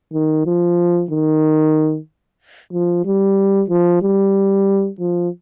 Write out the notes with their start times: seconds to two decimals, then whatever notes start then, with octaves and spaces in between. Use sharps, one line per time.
0.13 D#3
0.46 F3
1.11 D#3
2.73 F3
3.05 G3
3.70 F3
4.02 G3
5.00 F3